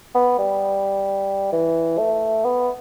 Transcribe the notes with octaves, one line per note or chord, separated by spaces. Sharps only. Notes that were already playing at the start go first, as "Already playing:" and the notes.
B3
G3
E3
A3
B3